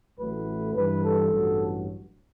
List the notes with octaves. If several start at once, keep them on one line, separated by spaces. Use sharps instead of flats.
A1 A2 F#3 A3 B4
G2 E3 G3 B4
A4
A1 G2 F#3